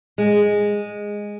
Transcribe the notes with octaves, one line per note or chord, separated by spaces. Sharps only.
G#3